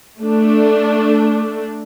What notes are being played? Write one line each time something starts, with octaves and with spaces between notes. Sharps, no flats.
A3 D4